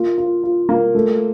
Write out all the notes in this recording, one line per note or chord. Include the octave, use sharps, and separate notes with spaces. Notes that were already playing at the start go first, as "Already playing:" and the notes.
Already playing: A#3 F4
F4
F4
A#3
A3